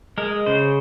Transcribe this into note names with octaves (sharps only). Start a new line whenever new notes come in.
G#3 A#4
C#3 C5